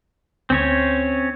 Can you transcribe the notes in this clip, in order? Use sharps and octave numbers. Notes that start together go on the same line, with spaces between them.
D2 C4 C#4 C#5